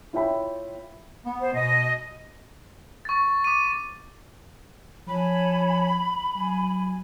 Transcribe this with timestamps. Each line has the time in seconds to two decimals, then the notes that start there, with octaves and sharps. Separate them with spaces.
0.13 E4 F4 C#5 E5 G5 B5
1.25 B3
1.40 C5
1.53 B2 D#5
3.05 C#6 A6
3.44 D6 D#7
5.08 F3 C#5 G#5 A5 B5
6.36 F#3 G#5